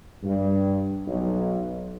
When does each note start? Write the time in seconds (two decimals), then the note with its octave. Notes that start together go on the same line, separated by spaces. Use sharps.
0.23 G2
1.07 B1